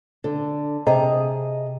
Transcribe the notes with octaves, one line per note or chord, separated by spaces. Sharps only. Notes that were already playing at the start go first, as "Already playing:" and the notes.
D3
C3 G#4 D#5 A#5